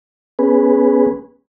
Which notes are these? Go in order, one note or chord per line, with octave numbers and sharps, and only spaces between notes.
B3 C#4 G#4 B4